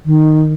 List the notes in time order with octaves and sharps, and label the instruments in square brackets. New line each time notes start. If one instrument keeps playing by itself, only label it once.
[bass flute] D#3